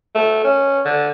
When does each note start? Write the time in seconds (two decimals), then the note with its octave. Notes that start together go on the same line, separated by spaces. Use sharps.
0.15 A3
0.44 C#4
0.85 D3